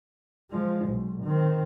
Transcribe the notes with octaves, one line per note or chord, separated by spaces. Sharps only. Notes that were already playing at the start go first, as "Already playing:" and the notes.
F3 G#3
B1
D#3 C4